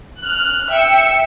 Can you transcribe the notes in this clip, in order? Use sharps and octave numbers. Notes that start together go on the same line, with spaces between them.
F6 F#6
E5 G5 E6 C#7